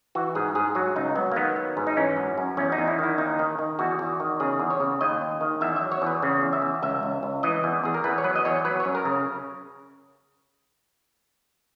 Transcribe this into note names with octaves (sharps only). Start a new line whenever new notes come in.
E3 F#4
G#2 G#4
G#2 G#4
F#3 F#4
C#2 D#4
F#3 B3
A#3
D#3 B3
F#3
G#2
D#4
E3 C#4
F#2
F#2
E2 C#4
D#4
E2
E4
D#3 E4
D#2 D#4
D#3
D#3
E2 F#4
E2
D#3
C#3 G#4
E2
C#5
C#3
D#2 D#5
D#2
D#3
E2 E5
F#3 E5
C#5
E2 B4
C#3
E2
E5
E2
C#2 E5
C#2
C#2
E3 D#5
E2
E2 G#4
A#4
E2 B4
C#5
F#3 B4
D#5
E2 C#5
F#3 B4
F#2 C#5
A#4
C#3